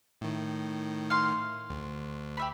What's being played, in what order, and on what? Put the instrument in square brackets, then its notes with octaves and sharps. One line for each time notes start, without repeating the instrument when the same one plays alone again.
[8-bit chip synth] A2 D#3
[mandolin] F5 C6
[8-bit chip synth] D2
[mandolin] G4 E5 B5